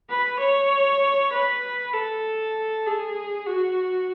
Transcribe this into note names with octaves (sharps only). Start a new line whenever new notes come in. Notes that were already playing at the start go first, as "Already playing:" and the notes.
B4
C#5
B4
A4
G#4
F#4